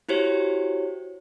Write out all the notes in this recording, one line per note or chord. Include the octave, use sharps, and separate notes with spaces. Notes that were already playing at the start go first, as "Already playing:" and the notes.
E4 F#4 G4 C5 C#5